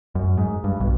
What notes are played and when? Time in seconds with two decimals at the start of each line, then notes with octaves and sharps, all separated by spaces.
0.15 F#2
0.37 G#2
0.64 G2
0.80 B1